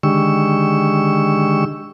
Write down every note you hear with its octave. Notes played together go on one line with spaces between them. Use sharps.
D3 D#3 G#3 G4 C#6 E6